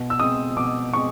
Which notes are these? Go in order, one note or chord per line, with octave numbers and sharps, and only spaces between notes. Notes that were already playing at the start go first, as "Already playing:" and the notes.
Already playing: B2
E6
G#3 C4 D#6
B2 D6
G#3 C4 C#6